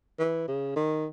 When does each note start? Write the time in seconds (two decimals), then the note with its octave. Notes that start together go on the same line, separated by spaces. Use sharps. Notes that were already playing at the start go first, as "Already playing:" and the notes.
0.19 E3
0.48 C#3
0.76 D#3